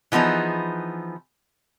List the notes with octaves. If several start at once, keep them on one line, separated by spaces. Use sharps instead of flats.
E3 F3 B3 D#4 G#4